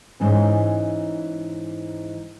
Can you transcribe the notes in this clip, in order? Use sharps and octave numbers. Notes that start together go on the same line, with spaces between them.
G#2 E3 C#4